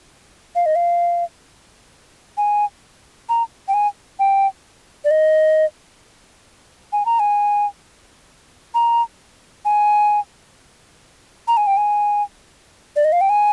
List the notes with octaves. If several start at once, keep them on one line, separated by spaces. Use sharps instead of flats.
F5
D#5
F5
G#5
A#5
G5
G#5
G5
D5
D#5
G#5
A#5
G#5
A#5
G#5
A#5
G#5
G5
G#5
D5
D#5
F5
G5
G#5